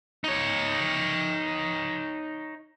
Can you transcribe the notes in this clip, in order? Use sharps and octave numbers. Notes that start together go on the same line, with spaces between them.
D#4 C#5